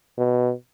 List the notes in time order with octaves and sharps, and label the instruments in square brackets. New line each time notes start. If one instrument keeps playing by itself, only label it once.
[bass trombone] B2